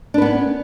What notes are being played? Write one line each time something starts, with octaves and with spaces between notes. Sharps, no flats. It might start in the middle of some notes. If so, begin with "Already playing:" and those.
B3 C#4 D4 B4